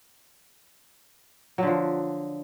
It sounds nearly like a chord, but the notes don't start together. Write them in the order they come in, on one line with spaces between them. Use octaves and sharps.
F#3 D3 F3